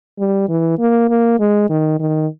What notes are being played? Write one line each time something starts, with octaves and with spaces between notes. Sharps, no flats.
G3
E3
A#3
A#3
G#3
D#3
D#3